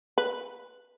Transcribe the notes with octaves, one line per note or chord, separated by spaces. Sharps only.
B4